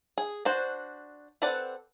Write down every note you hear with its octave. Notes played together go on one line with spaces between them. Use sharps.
G#4
D4 F#4 C5
C4 A4 B4 D5 F#5